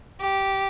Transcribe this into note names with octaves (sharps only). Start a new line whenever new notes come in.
G4